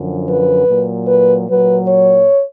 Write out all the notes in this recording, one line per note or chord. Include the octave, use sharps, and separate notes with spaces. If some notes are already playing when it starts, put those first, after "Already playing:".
Already playing: F#2 D3 F3
B4
A#2 F#3
B4
A#2 F#3 B4
C#5